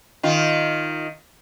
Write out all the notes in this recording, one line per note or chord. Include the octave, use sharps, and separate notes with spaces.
D#3 F4